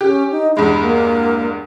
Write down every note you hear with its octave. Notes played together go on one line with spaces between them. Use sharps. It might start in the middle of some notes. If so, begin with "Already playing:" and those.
C#4 G4
D#4
E2 G2 G#3 B5
A#3